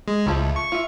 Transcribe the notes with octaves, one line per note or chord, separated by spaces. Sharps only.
G#3
C#2 F3 A3 E4
C#6
F4 E5